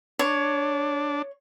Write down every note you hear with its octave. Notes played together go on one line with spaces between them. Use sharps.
D4 C#5